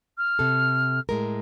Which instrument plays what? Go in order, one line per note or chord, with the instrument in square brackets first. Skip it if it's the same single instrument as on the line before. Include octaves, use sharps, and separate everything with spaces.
[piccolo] F6
[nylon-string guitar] C3 A4
A2 G#3 A#4